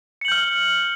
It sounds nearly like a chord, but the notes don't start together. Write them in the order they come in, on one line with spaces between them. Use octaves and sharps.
C#7 F#7 G6 F6 G7